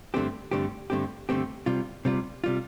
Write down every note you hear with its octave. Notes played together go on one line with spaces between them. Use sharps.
G2 D3 A3 C4 G4
G2 D3 A3 C4 G4
G2 D3 A3 C4 G4
G2 D3 A3 C4 G4
C3 G3 F4
C3 G3 F4
C3 G3 F4